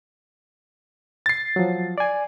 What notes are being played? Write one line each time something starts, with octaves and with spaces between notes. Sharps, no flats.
A6 C7
F3 F#3
D5 G#5